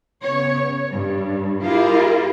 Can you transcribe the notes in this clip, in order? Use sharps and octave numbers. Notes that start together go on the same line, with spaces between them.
C#3 B3 C#5
G2
E4 F4 G4 G#4 A#4